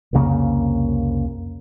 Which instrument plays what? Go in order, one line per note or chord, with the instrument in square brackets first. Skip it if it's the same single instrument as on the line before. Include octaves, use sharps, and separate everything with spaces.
[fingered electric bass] C2 F2 C#3 A#3